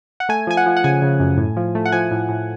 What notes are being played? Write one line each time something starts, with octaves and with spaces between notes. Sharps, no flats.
F#5
A3 G#5
F3 G#5
F#5
F3
F#5
C#3 G#5
C#3
F#2
A2
F3
A3
F#5
F3 G#5
A2
A2